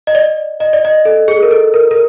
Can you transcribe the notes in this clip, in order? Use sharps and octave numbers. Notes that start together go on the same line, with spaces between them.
D#5
D5
D#5
D5
D#5
A4
G#4
A#4
A4
A#4
A#4